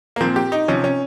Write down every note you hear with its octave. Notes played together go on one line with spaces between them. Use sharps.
A#3
A#2 F3 C4
G4
D#4
C3 F3 C#4
C#4